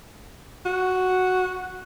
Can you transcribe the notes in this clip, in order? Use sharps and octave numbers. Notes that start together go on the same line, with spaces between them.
F#4